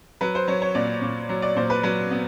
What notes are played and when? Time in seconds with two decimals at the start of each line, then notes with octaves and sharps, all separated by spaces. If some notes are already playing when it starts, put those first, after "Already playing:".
0.21 F#3 B4
0.35 C5
0.48 F#3 C#5
0.62 C#5
0.75 A#2 D5
1.02 A#2
1.29 F#3
1.42 D5
1.56 A#2 C5
1.70 B4
1.83 F#3 B4
2.10 B3